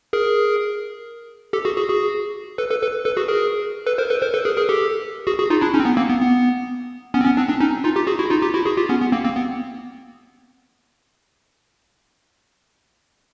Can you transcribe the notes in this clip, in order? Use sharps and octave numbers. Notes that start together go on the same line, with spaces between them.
G#4 A#4
G4 A4
F#4 G#4
F#4 G#4
F#4 G#4
A4 B4
A4 B4
A4 B4
A4 B4
F#4 G#4
G#4 A#4
A4 B4
A#4 C5
A4 B4
A#4 C5
A4 B4
G#4 A#4
G#4 A#4
G4 A4
F#4 G#4
F#4 G#4
D#4 F4
D4 E4
C#4 D#4
C4
B3
A#3 C4
B3
B3
B3 C#4
C4
B3 C#4
C4 D4
C4 D4
C#4 D#4
D#4 F4
F4 G4
F#4 G#4
E4 F#4
D#4 F4
F4 G4
E4 F#4
F#4 G#4
F4 G4
B3 C#4
B3
A#3 C4
A#3 C4
B3